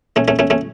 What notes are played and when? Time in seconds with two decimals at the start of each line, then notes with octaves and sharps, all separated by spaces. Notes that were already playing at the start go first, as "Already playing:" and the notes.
0.16 A3 C#4
0.28 A3 C#4
0.39 A3 C#4
0.50 A3 C#4